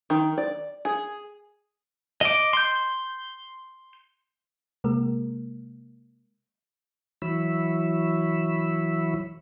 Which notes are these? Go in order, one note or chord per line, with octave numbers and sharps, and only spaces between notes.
D#3
D5
G#4
D#5 D6
C6 G6
C3 G#3 A#3 A#4
E3 F#3 E4 C#5 B5 E6